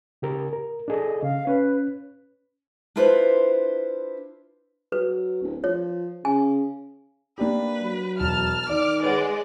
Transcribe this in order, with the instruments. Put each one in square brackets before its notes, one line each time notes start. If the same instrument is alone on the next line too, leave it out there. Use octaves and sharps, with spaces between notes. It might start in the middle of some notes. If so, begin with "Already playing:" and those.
[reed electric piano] C#3 G4 A#4
A#4
[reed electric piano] D4 G#4 A4 [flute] D#5
[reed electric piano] C#3 [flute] F5
[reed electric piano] C#4 [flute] B4
[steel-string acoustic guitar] D4 E4 F4 B4 C5
[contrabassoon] F#3 [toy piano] B4
[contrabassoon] D1
[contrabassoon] F3 [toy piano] C#5
[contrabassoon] C#3 [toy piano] G#5
[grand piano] A#3 D4 G4 [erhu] B4
[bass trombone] F#3
[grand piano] E1 [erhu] A5 [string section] F6
[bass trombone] D#3 [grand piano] D5 [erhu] D6
[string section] G#3 [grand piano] B4 C#5 F#5 [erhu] D5